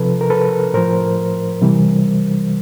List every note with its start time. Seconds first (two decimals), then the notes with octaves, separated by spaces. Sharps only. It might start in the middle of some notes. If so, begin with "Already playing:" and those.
Already playing: C3 F3 A4 B4
0.21 A#4
0.30 A4 B4
0.74 A2 F3 A#4 C5
1.62 C3 E3 G3